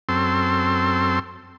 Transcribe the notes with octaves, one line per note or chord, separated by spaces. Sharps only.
F#2 C4 A4 C6